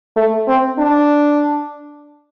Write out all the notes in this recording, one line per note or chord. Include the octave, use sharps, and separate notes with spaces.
A3
C4
D4